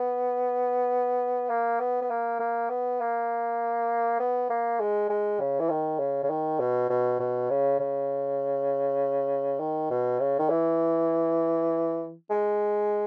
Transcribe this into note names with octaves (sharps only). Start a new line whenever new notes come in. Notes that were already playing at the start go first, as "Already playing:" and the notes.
Already playing: B3
A#3
B3
B3
A#3
A#3
B3
A#3
B3
A#3
G#3
G#3
C#3
E3
D#3
C#3
C#3
D#3
B2
B2
B2
C#3
C#3
D#3
B2
C#3
D#3
E3
G#3